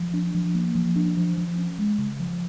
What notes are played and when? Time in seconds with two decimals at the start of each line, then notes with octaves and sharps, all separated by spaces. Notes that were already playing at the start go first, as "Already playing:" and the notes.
Already playing: F3
0.13 D4
0.35 F3
0.55 A#3
0.75 F3
0.96 D4
1.17 F3
1.37 F3
1.58 C#4
1.78 G#3
1.98 C#3
2.19 F3